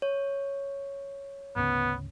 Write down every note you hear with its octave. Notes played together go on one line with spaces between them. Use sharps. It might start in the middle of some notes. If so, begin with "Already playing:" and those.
C#5
G#1 D2 C#3 B3